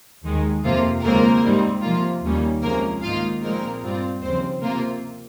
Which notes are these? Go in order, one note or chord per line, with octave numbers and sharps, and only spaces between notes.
D#2 D#3 G#3
F2 C3 F3 A#3 F4
D#2 C#3 G#3 A#3 C4 F4 A#4
G#2 G3 C4 D#4
C3 F3 A#3 F4
D#2 D#3 G3 A#3 C#4
C2 C3 F3 G#3 A#3 C#4 A#4
G#2 D#3 A#3 D#4 F4 F5
A#2 F3 G#3 A#3 C4 D#4 A#4
G2 G3 C4 F4
D#2 C#3 F3 C4 C5
C3 F3 A#3 C4 F4 A#4